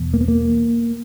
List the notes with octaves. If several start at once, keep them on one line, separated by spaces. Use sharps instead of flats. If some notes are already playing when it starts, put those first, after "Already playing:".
Already playing: E2 B2
A#3
B3
A#3